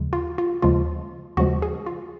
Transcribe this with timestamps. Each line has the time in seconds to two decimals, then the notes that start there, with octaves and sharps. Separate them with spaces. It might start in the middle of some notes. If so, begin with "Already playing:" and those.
Already playing: D#2 C#3 F3 G#3
0.13 F4
0.38 F4
0.62 D#2 C#3 F3 G#3 F4
1.37 D#2 C#3 F3 G#3 F#4
1.62 G#4
1.86 F4